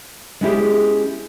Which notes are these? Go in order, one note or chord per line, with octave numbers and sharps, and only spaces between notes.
G#3 B3 C#4 E4 G4 G#4